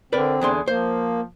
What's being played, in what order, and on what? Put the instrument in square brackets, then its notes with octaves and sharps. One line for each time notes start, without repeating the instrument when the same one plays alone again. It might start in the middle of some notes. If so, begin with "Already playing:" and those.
[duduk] D3 [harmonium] C4 [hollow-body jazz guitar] A#4 B4 D5
[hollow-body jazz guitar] E2 D3 C6 [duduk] G#4
[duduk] F3 [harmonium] A#3 [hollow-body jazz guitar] C5